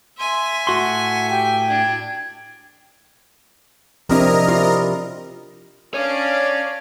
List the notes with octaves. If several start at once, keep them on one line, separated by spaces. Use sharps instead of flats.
E5 G#5 C6
A2 F#4 F#5 C6
G4 G5
D4 G#6
C3 F3 C4 D4 E4 A#4 D#5 A#5
E4 F4
C#4 D4 C#5 D5 F5 G#5